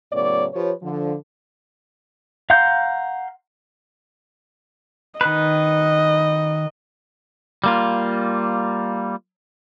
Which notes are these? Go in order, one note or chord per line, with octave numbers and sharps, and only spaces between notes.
A2 C#3 F#3 B3 C#5 D5
F3 G4 B4 C#5
D3 F3
F5 F#5 A#5 C6 G6
D#3 B4 D#5
G3 A#3 F4